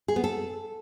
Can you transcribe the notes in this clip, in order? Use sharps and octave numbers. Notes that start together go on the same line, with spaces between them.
G#4
B3
A4